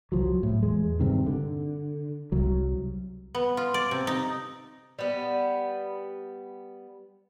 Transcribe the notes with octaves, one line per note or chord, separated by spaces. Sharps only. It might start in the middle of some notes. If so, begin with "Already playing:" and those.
C2 F3 F#3
A2
E2 G#3
G2 C3 D#3
D3
C2 F#3
B3
F4
D5
C3
D#4
G3 B3